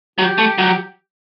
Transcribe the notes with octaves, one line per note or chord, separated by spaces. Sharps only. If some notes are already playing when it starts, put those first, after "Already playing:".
F#3 G4
A3
F#3